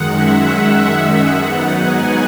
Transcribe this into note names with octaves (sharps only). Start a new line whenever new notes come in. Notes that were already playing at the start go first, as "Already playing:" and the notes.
Already playing: F#2 D#3 G#3 F#5
E5
F#5
G#2 F#3 B3 D#4
G#5